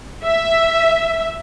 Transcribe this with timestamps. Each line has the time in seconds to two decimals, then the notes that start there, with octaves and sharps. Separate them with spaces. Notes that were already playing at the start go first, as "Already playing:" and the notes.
0.23 E5